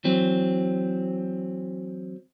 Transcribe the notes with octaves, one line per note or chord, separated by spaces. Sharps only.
E3 F#3 C4